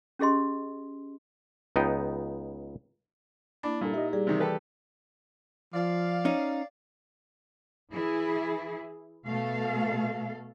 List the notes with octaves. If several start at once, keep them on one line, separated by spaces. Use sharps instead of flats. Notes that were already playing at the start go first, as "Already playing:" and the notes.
C#4 G4 G#4 D#5 C6
C#2 B3 D#4 G5
A#3 D4 E4 B5
A#2 G3 D4 A4
D#4 G4 D#5 E5
G3 G4 G#4 D5
C3 D#3 E3
G4 A4 B4
F3 D5 F5
C#4 D#4
E3 E4 G#4
B2 A3 A4 F5